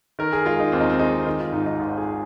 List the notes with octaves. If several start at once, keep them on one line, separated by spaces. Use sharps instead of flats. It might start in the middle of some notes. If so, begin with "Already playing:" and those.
D#3 A#4
G#4
G#3 F4
D#4
D#2 C4
D#4
C4
G#3 D#4
D#3 D#4
F4
G#2 D#4
D#4
G#1 F4
G#4